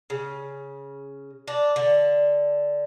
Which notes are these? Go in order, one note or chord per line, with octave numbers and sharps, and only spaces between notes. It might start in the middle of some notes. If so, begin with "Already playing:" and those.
C#3
D4
D3